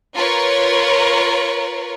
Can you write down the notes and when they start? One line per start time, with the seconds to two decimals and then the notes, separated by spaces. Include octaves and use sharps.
0.16 F4 A#4 B4 C#5 C#6